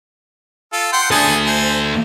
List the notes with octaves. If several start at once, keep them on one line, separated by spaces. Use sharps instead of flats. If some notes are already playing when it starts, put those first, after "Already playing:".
F4 A4
F#5 G5 C6
D2 G#4 A4 G#5 A5
C5 G#5